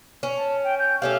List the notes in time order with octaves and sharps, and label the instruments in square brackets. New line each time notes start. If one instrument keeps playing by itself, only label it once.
[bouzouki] C#4
[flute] A5
G5
G6
[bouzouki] A3 C#4 F5 [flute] G4